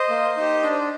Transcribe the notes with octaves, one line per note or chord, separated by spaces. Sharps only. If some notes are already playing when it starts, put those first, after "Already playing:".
Already playing: C5 D#5
A#3
D#4 G4
D4